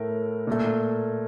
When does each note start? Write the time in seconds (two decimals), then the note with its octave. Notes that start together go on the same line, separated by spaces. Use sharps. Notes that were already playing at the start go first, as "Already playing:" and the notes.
Already playing: A2 A3 A#4
0.47 A#2 A3